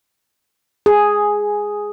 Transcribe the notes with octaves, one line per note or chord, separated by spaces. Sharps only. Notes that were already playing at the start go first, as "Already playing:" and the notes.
G#4